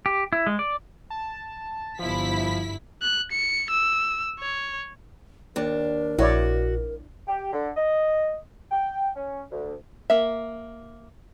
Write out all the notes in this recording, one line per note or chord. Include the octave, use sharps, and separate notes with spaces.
G4
E4
G#3
D5
A5
G1 F3 E4 B6
F#6
C#7
E6
C#5
D#2 D4 A#4
A#1 E4 F#4 C#5 D5
G4
D3
D#5
G5
C#4
D2
A#3 E5